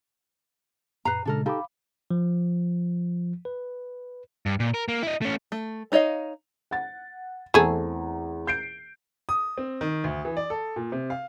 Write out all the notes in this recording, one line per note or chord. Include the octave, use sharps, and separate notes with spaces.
F#2 A#2 B4 A#5 C7
A#2 C#3 G#3 D4 A4 A#4
D#4 G4 A4 F5 B5 D6
F3
B4
G2
A#2
A#4
A#3
E4 D#5
A3 C#4
A3
D4 D#4 C#5 D#5 F5
F#5 A6
E2 A3 C4 G#4 A4 A#5
G6 C7 D7
D#6
C4
D#3
D2
E3
D5
A4
A#2
C3
F5